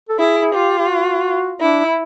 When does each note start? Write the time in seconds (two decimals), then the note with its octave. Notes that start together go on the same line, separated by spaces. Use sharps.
0.09 A4
0.19 E4 G#4
0.54 F4 G4
0.78 G4
0.90 F#4
1.61 D4 E4
1.86 E4